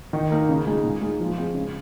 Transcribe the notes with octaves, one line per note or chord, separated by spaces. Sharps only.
D#3
A#3 D#4 A#4
C#3
G#3 D#4
A#2
G#3 D#4
F3
G#3 C4
C#3